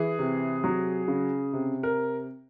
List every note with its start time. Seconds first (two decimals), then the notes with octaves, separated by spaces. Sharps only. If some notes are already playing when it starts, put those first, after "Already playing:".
Already playing: E3 G#4
0.19 C3
0.64 F#3
1.08 C#3
1.53 C3
1.83 A#4